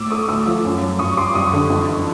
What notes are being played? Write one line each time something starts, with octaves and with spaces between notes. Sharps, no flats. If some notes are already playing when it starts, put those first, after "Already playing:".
Already playing: A2 D6 E6
A3 C#6 D#6
D2 D6 E6
F3
F#2
F#3
G2 C#6 D#6
G3 C6 D6
F#1 C#6 D#6
D3
F2
E3